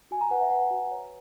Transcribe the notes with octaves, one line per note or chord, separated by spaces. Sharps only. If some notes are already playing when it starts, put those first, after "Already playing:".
F#4 G#5
A#5
B4 F#5
E5
B4 F#5
F#4
C#5